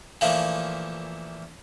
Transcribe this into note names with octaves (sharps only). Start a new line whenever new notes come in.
A#2 E3 F3 A3